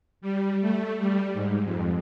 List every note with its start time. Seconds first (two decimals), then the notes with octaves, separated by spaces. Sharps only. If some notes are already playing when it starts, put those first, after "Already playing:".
0.21 G3
0.61 A3
0.98 G3
1.34 G#2
1.65 F2